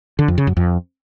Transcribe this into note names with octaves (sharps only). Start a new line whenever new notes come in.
D3
F2
C#3
F#2
F2